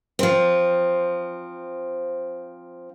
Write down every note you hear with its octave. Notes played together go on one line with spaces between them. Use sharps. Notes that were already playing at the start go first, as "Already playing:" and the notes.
F3 C4